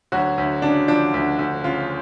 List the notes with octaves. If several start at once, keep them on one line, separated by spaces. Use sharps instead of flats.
D2 F#3 F#4
D2
C#3 D4
F3 D4
D2
D2
C#3 F4